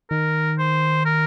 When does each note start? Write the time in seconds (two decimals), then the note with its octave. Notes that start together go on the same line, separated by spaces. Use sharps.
0.10 D#3 A#4
0.58 C5
1.05 A#4